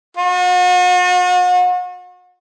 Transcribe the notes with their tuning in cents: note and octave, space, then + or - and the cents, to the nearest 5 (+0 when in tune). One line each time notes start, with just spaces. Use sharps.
F#4 -40